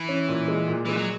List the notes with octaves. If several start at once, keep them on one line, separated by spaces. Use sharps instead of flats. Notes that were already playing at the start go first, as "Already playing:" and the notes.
Already playing: E3
C#4
A#2
G#3
A#2
E3 G#3
F#3